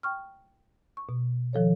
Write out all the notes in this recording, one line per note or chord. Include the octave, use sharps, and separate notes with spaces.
G5 C#6 F6
C#6
B2
D#3 F3 A4 C#5